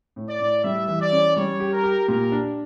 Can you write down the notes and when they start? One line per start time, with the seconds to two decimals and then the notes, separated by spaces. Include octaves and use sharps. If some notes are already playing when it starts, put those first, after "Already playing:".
0.16 A2
0.28 D5
0.40 A2
0.64 G3 E5
0.88 E3
1.00 D5
1.12 C#4
1.36 G3 C#5
1.60 G4
1.73 A#4
1.84 G4
2.08 A#2 A#4
2.32 D4